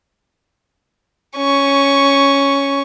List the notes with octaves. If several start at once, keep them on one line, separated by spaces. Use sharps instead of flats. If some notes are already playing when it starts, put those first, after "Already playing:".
C#4 C#6